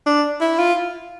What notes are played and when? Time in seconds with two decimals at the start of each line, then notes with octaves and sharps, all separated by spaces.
0.06 D4
0.41 E4
0.58 F4